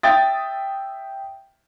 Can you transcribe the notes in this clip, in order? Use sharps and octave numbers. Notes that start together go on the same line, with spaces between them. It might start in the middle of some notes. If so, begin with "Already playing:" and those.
E5 G5 D#6 A6